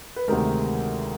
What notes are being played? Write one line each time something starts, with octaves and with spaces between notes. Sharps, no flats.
B4
D2 C3 D#3 G#3 A#4